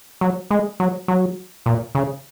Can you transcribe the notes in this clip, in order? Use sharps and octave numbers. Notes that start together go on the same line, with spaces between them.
F#3
G#3
F#3
F#3
A#2
C#3